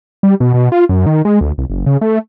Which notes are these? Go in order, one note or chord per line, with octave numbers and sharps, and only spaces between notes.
G3
B2
B2
F4
F#2
D#3
G#3
D2
C2
F#1
C#3
A3